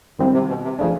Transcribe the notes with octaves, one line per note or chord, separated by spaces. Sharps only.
G#2 D#3 G3 C4 E4
C3
B2
C3
C#3 F3 A3 D4